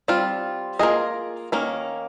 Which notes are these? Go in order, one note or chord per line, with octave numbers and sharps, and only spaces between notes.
G3 C4 F4
A#3 F4 G#4 D#5
D#3 A#3 C#4